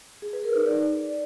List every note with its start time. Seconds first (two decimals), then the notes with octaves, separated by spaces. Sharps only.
0.22 G#4
0.33 B4
0.44 A#4
0.55 D#4
0.66 D5